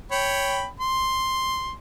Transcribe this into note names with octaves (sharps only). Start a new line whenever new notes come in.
C#5 G5 B5
C6